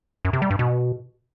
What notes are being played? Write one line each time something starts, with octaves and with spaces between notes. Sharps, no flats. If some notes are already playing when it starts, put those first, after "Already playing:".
F#2
C3
G3
G2
B2